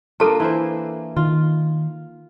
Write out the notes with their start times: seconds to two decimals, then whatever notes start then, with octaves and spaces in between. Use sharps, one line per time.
0.20 A#3 D4 F4 A4 A5
0.40 E3 E4 C5
1.16 D#3 F4